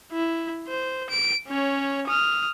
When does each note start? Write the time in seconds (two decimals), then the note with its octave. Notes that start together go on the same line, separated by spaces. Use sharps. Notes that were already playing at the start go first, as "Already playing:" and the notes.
0.13 E4
0.68 C5
1.10 D7
1.48 C#4 C#5
2.08 D#6 F6